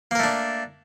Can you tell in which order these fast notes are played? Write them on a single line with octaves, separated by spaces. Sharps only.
A#3 A#4 A3 D4